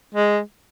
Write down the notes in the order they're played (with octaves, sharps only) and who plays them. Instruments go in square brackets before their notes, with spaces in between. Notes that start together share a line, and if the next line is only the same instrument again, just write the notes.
[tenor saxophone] G#3